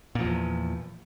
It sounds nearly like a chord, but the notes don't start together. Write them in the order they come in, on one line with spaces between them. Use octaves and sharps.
A#2 F3 E2